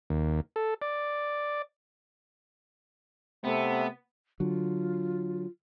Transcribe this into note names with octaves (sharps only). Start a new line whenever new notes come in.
D#2
A4
D5
C3 A3 B3
D3 F#3 F4